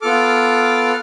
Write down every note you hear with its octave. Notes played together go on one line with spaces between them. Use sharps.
B3 F4 A4 D6 F6